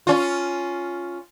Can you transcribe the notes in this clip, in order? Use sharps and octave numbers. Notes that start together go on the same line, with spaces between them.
C#4 F4